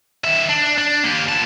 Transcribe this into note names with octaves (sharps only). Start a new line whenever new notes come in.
D#3 E5
D4
D4
A#3 G4
A#2 A5